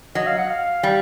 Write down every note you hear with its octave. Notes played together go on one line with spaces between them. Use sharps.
F#3 D#5
F5
F#5
F5
G3